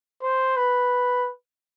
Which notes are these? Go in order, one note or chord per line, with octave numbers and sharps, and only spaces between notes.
C5
B4